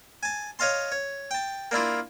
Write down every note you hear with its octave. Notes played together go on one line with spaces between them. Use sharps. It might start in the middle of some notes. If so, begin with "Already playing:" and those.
G#5 A5
C#5 D#5 F5 A5 C6
C#5
G5 A5
A#3 D4 E4 F4